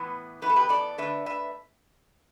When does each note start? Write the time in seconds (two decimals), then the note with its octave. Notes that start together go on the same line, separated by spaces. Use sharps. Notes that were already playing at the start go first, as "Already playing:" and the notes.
Already playing: A2 E3 B3 E4
0.42 A2 E3 B3 E4 B4
0.50 A4
0.56 G4 B4
0.69 A4 D5
0.98 D3 A3 D4 B4 E5
1.26 B4 E5